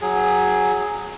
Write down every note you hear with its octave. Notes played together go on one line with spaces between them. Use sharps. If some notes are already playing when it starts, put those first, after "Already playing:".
F#3 G#4